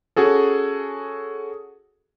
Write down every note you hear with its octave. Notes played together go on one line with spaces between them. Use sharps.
C#4 F#4 G#4 A4